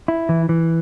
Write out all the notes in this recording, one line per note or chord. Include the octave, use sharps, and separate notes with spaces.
E4
E3
E3